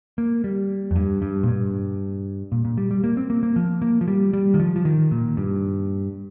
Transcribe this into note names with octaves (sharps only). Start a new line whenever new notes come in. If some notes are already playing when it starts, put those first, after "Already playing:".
A#3
G3
F2
G2
G2
A#2
G2
A#2
A#2
G3
G3
A#3
C4
A#3
A#3
F3
A#3
F3
G3
G3
D#3
F3
F3
D#3
A#2
G2